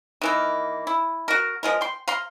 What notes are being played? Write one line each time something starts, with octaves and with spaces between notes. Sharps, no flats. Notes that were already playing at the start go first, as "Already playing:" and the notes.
D#3 E3 A#3
E4
F#4 A#4
F3 G#3 A#4
G5 C6
F5 A#5 C6